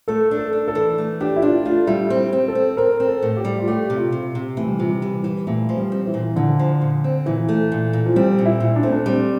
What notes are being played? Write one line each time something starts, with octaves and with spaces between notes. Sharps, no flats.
A3 A4
D4
A4
D4
A4
E3
A3
D4 G4
E4
D4 F4
A3 F4
G3 E4
C4
C4
A4
C4
C4 A#4
C4
A4
A2
G4
G3
F4
A3 G4
C3
F4
C3
C3
E3 A3
G3
C3 F3
G3
E3
E3
A#2 A3
F3
G3
C4
E3
A#2
A#2 D3
F3
A#2
C4
A#2 E3
A3
A#2
A#2
F3
G3 C4
A#2
E4
A#2
D4
A3 C4
D4
G3 C4